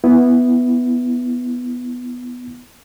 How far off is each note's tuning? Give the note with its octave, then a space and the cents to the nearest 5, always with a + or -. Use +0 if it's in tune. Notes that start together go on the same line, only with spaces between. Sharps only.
B3 +0 E4 +0